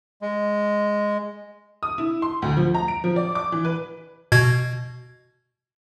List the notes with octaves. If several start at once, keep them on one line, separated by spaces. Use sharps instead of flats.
G#3
D#6
E4
C6
D2
F3
A#5
D7
F3
D5
D6
E3
B4
B2 G#6